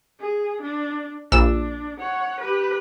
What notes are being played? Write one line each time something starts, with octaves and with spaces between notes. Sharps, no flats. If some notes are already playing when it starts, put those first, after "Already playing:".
G#4
D4
A#1 D4 E6
C#5 F#5
G4 B4